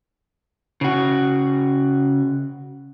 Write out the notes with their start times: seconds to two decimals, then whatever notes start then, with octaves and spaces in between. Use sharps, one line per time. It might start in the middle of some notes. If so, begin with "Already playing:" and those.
0.81 C#3 F#4